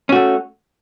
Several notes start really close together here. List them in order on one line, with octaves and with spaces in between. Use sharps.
C#4 F#4 A3